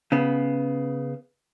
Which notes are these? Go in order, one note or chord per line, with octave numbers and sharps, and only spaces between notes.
C#3 B3